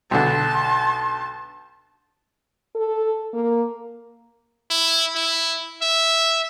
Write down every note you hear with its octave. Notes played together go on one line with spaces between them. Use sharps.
B1 D3 A5 C6
A4
A#3
E4
E4
E5